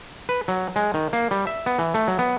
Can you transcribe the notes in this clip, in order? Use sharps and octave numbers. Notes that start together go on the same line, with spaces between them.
B4
F#3
G#3
D#3
A#3
G3
E5
B3
E3
A3
F#3
B3